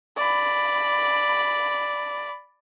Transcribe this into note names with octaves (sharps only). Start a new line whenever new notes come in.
D5 B5